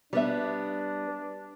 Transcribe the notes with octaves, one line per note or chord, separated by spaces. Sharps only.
G3 B3 D4 D5 E5